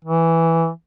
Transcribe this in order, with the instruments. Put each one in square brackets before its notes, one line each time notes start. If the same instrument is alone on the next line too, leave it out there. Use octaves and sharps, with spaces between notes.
[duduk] E3